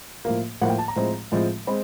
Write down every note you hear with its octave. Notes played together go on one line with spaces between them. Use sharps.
A2 F3 A#3
A2 F3 A#3 F#5
G5
A5
A#5
A2 F3 G#3 C4
A2 F3 G#3 C4
G#3 C4 B5